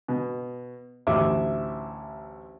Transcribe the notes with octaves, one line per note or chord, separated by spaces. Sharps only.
B2
A1 D2 E5 D6